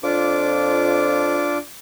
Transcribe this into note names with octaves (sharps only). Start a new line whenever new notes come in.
F2 D4 F4 D6